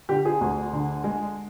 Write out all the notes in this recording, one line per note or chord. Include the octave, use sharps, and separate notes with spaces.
D3 G4
G#4
D2
D3
G#3